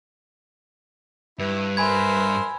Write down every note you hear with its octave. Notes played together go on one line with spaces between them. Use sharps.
G2 E4 B4
A#4 C5 E5 G#5 B5 G#6